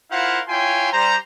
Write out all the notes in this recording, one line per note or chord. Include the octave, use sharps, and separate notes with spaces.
E4 F4 A#4 C5 F5 F#5
E4 F4 C#5 G5 G#5 C6
G3 C5 A#5